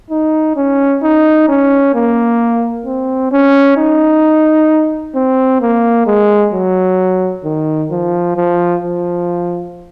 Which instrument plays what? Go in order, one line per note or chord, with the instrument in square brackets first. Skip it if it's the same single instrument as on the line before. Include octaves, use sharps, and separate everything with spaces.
[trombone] D#4
C#4
D#4
C#4
A#3
C4
C#4
D#4
C4
A#3
G#3
F#3
D#3
F3
F3
F3